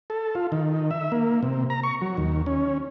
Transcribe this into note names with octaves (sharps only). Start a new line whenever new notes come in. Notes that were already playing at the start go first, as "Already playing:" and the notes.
A4
F4
D#3
E5
A#3
C3
A#5
C#6
F#3
D#2
C#4